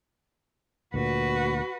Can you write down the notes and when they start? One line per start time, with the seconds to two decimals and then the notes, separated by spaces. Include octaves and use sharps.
0.94 D2 A#2 F#4 B4